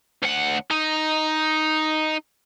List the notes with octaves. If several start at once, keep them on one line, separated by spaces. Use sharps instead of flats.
D2 F#5
D#4